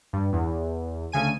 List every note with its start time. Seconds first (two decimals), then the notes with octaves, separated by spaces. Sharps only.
0.13 G2
0.33 E2
1.12 D2 C#3 G#5 D#7